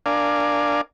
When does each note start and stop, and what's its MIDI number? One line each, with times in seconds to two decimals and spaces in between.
0.06 0.81 62
0.06 0.81 70
0.06 0.81 74
0.06 0.81 77
0.06 0.81 80